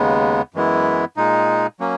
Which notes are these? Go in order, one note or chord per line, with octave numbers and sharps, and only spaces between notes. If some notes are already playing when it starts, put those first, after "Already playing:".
Already playing: D#2 C#3 G#3 B3
F#2 E3 G#3 B3 E4
A#2 G#3 D#4
F#3 A#3 C#4